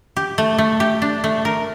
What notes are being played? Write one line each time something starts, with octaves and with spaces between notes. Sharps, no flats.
G4
A3
A3
G4
D4
A3
A#4